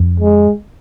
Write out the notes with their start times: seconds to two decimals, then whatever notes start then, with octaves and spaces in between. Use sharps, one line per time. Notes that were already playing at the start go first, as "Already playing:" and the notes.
Already playing: F2
0.20 G#3